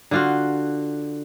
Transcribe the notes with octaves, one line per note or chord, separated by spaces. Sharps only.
D3 F4 F#4